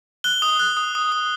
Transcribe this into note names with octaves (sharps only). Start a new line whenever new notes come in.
F#6 G7
D#6
F#6
D#6
D#6
D#6